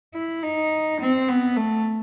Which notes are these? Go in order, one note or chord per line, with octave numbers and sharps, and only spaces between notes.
E4
D#4
C4
B3
A3